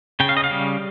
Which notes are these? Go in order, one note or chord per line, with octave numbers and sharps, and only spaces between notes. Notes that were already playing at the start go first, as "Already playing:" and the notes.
C#3 G5
F5
D#5
F5
G3